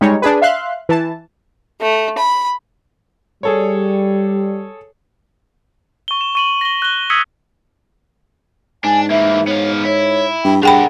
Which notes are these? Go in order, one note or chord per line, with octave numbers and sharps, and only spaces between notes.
G3 G#3 D#4 C#5
D4 G#4 B4
E5 F5 C6 F#6
E3 A5
A3
B5
G3 G#4 A4 C#5
C#6 G7
E7
C#6 D#7 F#7
A#6 G7
F#6 G7
D#6 E6 G#6 B6 C#7 D#7
G#2 D4 G#5
E3 A#3 E5
B3 C#5 F5
E4 C#5
G2 G5
G2 D4 G#4 A#4 F#5 G5 B5